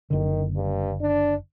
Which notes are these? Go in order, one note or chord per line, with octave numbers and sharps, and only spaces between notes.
F#1 D3 D#3
G2
D4